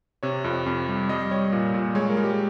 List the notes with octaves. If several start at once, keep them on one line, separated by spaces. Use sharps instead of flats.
C3 C#5
F2
F2
G3
G3 D#5
G3 C#5
A#2
A#2
G#3 C#5
A#4
G#3
G4